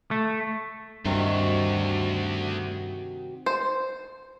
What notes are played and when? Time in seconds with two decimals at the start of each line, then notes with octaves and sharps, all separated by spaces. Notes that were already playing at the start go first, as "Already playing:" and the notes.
0.11 A3
1.05 D2 G2 C3 D#3 F#4
3.46 C5